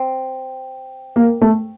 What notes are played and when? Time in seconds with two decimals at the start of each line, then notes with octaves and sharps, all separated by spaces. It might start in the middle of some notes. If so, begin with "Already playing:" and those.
Already playing: C4
1.16 A#3
1.42 A3